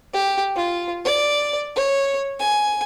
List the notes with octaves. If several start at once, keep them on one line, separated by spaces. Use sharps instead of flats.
G4
F4
D5
C#5
G#5